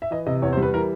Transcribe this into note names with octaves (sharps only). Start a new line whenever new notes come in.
E5
E3 D#5
C3 D#5
E2 C#5
C5
G3
B4
E3 A#4